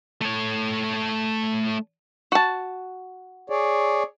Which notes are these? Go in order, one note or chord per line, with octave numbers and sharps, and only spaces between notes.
A3 C#5
F#4 A5
G#4 C#5 D5